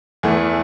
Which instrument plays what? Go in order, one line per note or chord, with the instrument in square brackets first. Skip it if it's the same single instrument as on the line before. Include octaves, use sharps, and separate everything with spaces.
[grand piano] E2 E3 A3